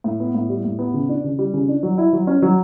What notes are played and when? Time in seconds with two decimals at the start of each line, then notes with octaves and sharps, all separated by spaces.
0.04 A2
0.20 B3
0.34 A2
0.49 G3
0.65 A2
0.79 B3
0.94 C#3
1.09 D4
1.24 C#3
1.39 G3
1.54 C#3
1.68 D4
1.83 F#3
1.98 E4
2.13 F#3
2.27 C#4
2.42 F#3